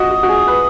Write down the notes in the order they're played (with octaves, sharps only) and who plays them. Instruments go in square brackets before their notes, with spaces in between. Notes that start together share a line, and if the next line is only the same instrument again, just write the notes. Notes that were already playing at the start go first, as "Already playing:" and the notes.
Already playing: [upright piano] F#4 D#5 [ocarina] D#6
[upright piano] F#4
F#4
G#4
B4